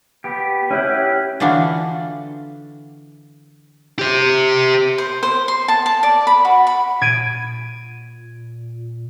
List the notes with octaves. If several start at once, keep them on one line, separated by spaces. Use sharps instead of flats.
B3 G4
C#4 E4 G4 F#5
D3 E3 D4 F4 F#4
G4 C5
C5
C5
C6
A5
A5
D5
B5
F#4
B5
A#2 G#6 D7 D#7